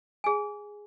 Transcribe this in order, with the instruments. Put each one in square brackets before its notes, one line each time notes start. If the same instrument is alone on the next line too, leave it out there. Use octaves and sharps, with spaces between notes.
[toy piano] G#4 G#5